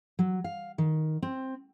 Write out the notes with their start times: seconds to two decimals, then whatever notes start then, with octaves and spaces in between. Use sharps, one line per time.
0.19 F#3
0.44 F5
0.78 D#3
1.23 C4